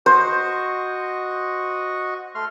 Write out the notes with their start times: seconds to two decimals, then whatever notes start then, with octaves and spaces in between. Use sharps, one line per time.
0.06 F#4 C5 D#5 C#6
2.35 A3 C6 F6